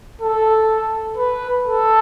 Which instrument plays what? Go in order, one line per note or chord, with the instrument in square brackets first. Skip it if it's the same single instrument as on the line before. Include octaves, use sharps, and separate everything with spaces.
[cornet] A4
B4
A4